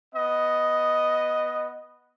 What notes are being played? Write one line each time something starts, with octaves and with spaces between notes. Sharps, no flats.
B3 D#5